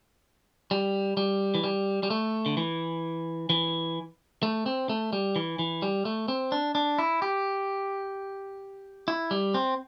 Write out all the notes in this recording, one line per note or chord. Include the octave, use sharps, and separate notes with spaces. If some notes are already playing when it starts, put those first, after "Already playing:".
G3
G3
E3
G3
G3
A3
D3
E3
E3
A3
C4
A3
G3
E3
E3
G3
A3
C4
D4
D4
E4
G4
E4
G3
C4